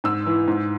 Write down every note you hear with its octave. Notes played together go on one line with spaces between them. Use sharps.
G#2 E6
E3
G#2